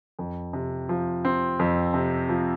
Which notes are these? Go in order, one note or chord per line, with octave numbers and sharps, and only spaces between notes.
F2
C3
F3
C4
F2
C3
F3